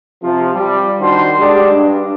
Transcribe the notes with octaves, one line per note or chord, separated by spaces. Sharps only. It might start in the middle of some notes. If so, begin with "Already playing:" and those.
C3 F3
G3
D#3 D4 F#4 C5
G3 G#3 D4 G4
G2